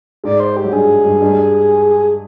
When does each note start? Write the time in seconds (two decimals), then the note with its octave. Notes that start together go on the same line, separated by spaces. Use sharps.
0.24 G#2 G#3 D5
0.40 C5
0.57 G4
0.64 F#3
0.72 G2 G3 G#4
1.05 G2 G3
1.21 G2 G3
1.33 G3